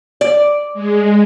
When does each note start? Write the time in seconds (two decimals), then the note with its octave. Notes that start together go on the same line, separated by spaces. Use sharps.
0.21 D5
0.74 G#3